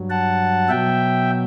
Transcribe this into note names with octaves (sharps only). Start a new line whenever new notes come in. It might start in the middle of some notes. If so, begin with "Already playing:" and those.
Already playing: G2 F#3
F#5 A5
B2 F#3 E5 G5